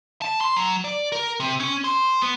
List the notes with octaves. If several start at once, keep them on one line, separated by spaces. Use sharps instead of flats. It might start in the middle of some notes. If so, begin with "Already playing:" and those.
A5
C6
F#3
D5
A#4
C3
C#4
C5
B3